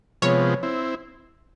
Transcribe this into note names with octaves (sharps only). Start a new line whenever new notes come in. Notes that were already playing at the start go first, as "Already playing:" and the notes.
C3 F3 G#3 B3 C#5
C4 E4